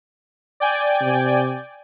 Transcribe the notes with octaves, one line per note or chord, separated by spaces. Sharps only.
D5 G5 G#5
C3